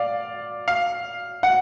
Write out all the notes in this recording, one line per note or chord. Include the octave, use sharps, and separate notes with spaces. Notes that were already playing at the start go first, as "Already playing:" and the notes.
Already playing: D5 F5
F5
F#5